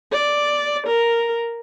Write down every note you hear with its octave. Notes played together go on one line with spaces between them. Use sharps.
D5
A#4